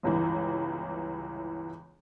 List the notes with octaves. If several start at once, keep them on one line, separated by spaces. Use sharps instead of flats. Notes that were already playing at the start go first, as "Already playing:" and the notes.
G1 C#2 E3